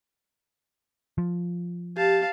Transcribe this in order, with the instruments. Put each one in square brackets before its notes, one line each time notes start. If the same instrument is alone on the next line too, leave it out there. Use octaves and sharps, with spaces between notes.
[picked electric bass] F3
[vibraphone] G4 [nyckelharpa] F5 A5